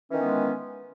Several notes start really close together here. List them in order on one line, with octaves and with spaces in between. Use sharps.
E3 C#4 D#3 B3 G#3